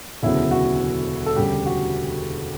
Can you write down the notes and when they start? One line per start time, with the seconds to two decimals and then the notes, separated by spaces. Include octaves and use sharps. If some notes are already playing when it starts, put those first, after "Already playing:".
0.23 E1 D2 C#3 F#3 B3 E4
0.51 F#4
1.26 A4
1.36 E1 D2 C#3 G3 G4
1.66 F#4